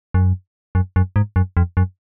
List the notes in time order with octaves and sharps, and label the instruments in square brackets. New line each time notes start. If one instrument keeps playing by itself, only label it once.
[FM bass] F#2
F#2
F#2
G#2
F#2
F2
F#2